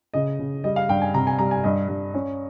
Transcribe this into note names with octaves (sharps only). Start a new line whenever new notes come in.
C#3 D#5
C#3
G3 D#5
F5
G2 G5
G#5
C3 A#5
G#5
G3 A#5
G#5
G2 D#5
G2
C#4